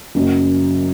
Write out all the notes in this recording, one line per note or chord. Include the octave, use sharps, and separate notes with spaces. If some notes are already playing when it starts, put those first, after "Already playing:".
F#1 F#2 C#3 F#3